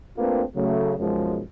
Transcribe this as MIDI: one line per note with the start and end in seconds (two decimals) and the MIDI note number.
0.18 0.43 57
0.18 0.43 58
0.18 0.43 60
0.18 0.43 62
0.18 0.43 65
0.18 0.43 71
0.56 0.93 49
0.56 0.93 54
0.56 0.93 57
0.99 1.40 35
0.99 1.40 42
0.99 1.40 53
0.99 1.40 56